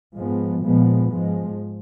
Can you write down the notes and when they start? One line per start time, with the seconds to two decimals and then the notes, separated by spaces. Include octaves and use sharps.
0.15 G#2 F3 G#3 B3
0.63 A#2 F3 G#3 B3
1.10 G#2 F3 G#3